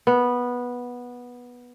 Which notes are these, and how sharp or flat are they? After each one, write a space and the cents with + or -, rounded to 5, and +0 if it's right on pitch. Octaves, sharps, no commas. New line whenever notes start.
B3 -10